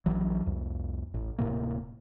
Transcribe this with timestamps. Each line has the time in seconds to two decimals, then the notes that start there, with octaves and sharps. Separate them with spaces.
0.06 A#1 E3 F#3
0.46 C2 F2
1.14 A1
1.38 D1 A2 C3 A#3